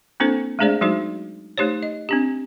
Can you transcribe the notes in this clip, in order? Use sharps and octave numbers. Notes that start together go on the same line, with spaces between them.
A#3 C4 D4 E4 A4 C5
G#3 A3 D4 G#4 C5 D5
F#3 G#3 D#4 F#4 C5
A3 D#4 G4 C5 C#5
D#5
C4 D4 G4